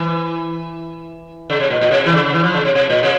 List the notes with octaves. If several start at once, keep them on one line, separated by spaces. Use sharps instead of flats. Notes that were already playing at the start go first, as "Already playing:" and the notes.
Already playing: E3
C#3
C3
A#2
A#2
C3
E3
C#3
E3
F3
C#3
C3
C3
A#2
C3